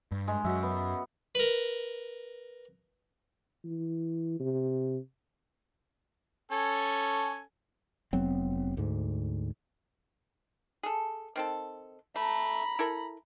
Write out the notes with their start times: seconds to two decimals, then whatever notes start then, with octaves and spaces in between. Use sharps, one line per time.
0.12 G2
0.28 G#3
0.44 F#2 F#3 F#4 E5
0.63 B3
1.35 A#4 B4
3.64 E3
4.40 C3
6.51 C#4 A4 G#5
8.13 F1 F#3 B3 C4
8.77 D2 G#2
10.83 G#4 A4
11.36 D#3 C4 A4
12.16 A3 A#5 B5
12.79 E4 A4 A#4